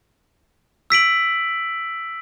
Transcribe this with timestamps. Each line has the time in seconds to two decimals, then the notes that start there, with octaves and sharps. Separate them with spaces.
0.90 E6 B6 D7 F#7